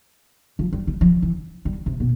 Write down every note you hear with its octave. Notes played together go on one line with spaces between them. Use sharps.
F3
G3
G3
F3
E3
G3
C3
B2